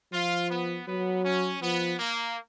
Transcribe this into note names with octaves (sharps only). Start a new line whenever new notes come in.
F3 F4
B3
F#3 B3
C#4
F3 B3
A#3